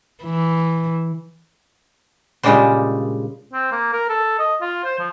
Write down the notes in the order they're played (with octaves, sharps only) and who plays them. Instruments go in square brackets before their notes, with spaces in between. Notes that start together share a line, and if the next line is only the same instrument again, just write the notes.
[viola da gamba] E3
[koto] A#2 C#3 G3 G#3 D4 C5
[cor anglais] C4
A#3
A#4
A4
D#5
F4
C5
F3